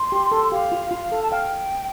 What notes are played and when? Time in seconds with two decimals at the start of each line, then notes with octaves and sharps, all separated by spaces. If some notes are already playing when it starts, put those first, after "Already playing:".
Already playing: C6
0.12 G4
0.32 A4
0.51 G4 F5
0.72 F4
0.91 F4
1.12 A4
1.22 A5
1.31 F5 G5